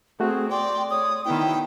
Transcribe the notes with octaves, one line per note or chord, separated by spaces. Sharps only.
A3 C4 F#4 G#4
D5 G5 C6
C#5 D#6
D#3 B3 E4 G5